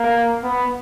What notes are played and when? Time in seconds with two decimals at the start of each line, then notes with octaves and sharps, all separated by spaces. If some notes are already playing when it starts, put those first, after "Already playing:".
Already playing: A#3
0.44 B3